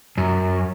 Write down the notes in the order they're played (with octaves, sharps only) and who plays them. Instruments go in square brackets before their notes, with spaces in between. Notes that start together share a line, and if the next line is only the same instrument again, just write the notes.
[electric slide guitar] F#2